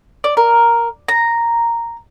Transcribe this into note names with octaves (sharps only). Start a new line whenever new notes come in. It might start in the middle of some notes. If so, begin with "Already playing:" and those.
D5
A#4
A#5